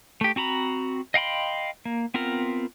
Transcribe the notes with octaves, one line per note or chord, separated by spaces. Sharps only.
A3 G4
C4 F#4 A#5 B5
D#5 F5 G5 B5 C6
A#3
B3 C4 F4 A#4